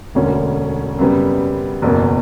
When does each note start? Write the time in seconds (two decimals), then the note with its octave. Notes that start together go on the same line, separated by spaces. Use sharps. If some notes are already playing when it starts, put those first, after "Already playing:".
0.15 E1 D2 D3 A#3 C#4
0.98 F#2 C#3 G3 B3
1.82 F#1 E2 B2 A#3